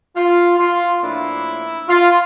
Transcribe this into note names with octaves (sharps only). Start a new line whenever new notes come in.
F4
F4
A2 F3 A#3 D4 E4
F4